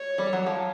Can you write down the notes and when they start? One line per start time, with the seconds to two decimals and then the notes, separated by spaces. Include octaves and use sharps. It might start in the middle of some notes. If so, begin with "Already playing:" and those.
Already playing: C#5
0.18 G3
0.33 F#3
0.46 F3